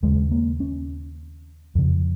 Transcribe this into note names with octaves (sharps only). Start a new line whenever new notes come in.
D#2 C#3 G#3
A#3
C#4
F2 C#3